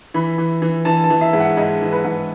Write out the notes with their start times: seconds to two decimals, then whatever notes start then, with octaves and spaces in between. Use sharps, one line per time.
0.14 E3 B5
0.38 E3
0.62 E3
0.85 E3 A5
1.04 A5
1.10 E3
1.21 E5
1.33 G#2
1.40 F#5
1.57 G#2 D#5
1.82 E3
1.92 B4
2.04 G#2